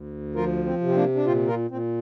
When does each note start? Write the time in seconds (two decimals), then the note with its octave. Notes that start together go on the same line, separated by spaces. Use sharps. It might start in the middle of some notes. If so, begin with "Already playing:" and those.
Already playing: D2
0.36 F3 F4 A#4
0.66 C4
0.81 C3
0.88 C4
0.96 A#3 D4
1.15 D4
1.26 A#2 C4 F4
1.48 F4 A#4
1.71 A#2 C4